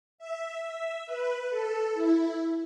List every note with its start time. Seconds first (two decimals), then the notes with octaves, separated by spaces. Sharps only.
0.18 E5
0.62 E5
1.07 B4
1.50 A4
1.94 E4